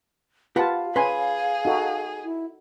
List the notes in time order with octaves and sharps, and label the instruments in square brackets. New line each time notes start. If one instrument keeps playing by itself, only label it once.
[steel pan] F4 A5 [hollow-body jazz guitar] G4 B4 F#5 [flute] F5
[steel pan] C#4 G#5 [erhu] G#4 [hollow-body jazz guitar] B4 C6
[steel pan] D#4 F#4 A4
[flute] E4